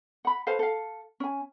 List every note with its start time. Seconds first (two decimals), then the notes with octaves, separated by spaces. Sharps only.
0.25 F#5 B5
0.47 A4 B4 C5 F5
0.59 A4 F5
1.20 C#4 G#5